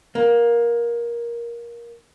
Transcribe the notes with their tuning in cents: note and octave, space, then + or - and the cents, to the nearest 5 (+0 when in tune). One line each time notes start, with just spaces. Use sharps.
A#3 +15